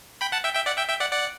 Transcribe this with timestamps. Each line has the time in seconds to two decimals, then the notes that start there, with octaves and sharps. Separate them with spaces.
0.21 G5 B5
0.32 F#5 A5
0.44 E5 G5
0.55 E5 G5
0.66 D5 F#5
0.78 E5 G5
0.89 E5 G5
1.00 D5 F#5
1.12 D5 F#5